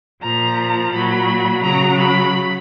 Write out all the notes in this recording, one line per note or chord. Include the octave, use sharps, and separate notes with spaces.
A#2 F3 A#5
A#2 F#3 B5
C#3 F#3 A#5
B5